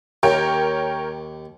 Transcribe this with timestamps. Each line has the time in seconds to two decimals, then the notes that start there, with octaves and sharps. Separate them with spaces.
0.23 D#2 A#4 C#5 G5